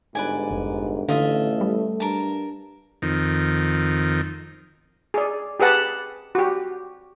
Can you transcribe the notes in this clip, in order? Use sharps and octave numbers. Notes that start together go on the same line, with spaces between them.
G1 G#2 B4 D5 G#5
F1
A1 D3 A3 F4 D#5 E5
G3
G2 A#4 A5
F2 D#3
G#4 D5
G4 G#4 B4 F#5 A5
F#4 G4